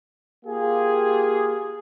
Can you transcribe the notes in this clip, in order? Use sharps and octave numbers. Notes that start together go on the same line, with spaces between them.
A#3 F4 G4 G#4